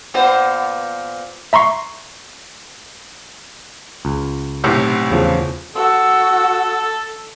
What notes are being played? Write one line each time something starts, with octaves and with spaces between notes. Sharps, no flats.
A#2 B3 C5
E5 A#5 C6 C#6 C7
C#2
B1 A2 C3
E2 C#3 F3
F#4 A4 E6